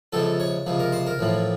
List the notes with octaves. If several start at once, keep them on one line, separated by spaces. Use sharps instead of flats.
C#2 C3 F3 A4
C#5
C#2 C3 F3
A#4
C5
A#4
A1 A2 F3